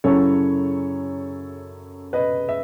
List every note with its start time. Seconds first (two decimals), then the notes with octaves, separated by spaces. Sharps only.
0.04 F#2 C#3 F#3 C#4 E4 A4 C#5
2.13 B4 D#5
2.49 E5